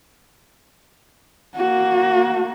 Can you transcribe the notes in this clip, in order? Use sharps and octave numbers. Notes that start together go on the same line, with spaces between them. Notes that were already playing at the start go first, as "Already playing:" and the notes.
A#3 F#4